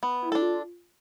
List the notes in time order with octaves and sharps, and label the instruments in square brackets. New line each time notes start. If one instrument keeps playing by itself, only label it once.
[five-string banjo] B3
[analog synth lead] E4
[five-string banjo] D4 A4
[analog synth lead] F4